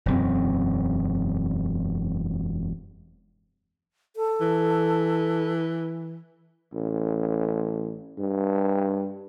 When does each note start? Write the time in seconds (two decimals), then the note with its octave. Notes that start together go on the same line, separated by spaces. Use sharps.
0.06 E1 F#2 C4
4.16 A4
4.41 E3
6.74 A1
8.18 G2